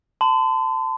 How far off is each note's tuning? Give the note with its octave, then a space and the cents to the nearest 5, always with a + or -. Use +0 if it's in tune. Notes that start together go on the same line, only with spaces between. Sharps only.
A5 +20 C6 -45